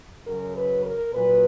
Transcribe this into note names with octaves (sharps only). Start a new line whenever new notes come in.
F#2 C#3 F#3 A#4
B4
A#4
A#2 F#3 B4